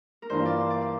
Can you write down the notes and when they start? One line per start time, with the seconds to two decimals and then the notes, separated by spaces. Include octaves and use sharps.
0.22 A#4
0.30 G2 E3 A#3 F4 C5
0.45 D5
0.60 C5
0.70 D5
0.81 D5